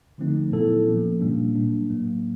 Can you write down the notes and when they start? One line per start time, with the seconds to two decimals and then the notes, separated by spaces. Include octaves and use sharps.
0.18 D3 F3 A3 C4 D#4
0.52 A#2 F#3 B3 E4 A4
0.87 F3 A#3 C#4
1.21 A#2 G3 A#3 D4
1.55 F#3 A#3 D4
1.89 A2 F#3 A#3